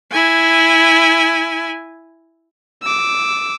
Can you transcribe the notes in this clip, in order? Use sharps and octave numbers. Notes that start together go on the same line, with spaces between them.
E4 G#5
D6 E6